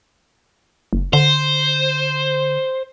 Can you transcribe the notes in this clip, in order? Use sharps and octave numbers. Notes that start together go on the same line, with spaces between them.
F#1
D3 C5